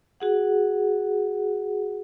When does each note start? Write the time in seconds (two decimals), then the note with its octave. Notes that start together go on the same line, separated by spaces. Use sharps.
0.20 F#4 G#4 F#5